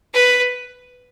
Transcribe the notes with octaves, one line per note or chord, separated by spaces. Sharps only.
B4